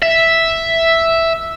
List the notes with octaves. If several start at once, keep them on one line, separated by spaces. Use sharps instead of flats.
E5